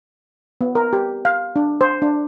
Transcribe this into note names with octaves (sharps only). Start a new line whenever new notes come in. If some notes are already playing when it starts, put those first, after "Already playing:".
B3
A#4
G4
F5
D4
C5
D4